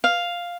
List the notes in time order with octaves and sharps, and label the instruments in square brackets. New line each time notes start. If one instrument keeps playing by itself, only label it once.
[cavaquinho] F5